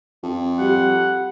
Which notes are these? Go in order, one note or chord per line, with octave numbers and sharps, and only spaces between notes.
F2
G3 F#5